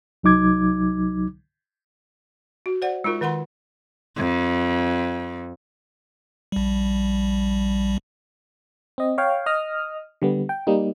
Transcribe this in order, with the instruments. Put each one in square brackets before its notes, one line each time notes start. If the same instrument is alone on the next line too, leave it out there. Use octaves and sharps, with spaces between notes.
[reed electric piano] C2 F#3 D#4 D6 G#6
[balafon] F#4
C5 D5 F#5
G#3 D#4 F4 A#4
D#3 A#4 F#5 B5 C6
[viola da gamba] F2
[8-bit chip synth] A#1 G3
[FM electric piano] C4 D#5
C#5 F5 G5
D#5 D#6 F6
D3 G3 B3
G5
G3 A#3 D#4